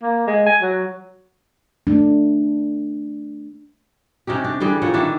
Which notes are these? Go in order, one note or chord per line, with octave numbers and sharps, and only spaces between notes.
A#3
G#3
G#5
F#3
A3 D4
C3 C#4 D#4 G4
D4
D3 E3 G3 G#4
A#2 C#5 F#5
D#3 E3 D4 E5